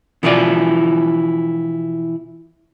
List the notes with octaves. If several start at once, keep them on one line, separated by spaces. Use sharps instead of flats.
B2 E3 F3 E4 F4 D5